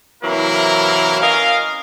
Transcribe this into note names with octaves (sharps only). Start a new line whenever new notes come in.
C3 E3 F#3 A#3 E4 A#4
C#4 A#4 D#5 F5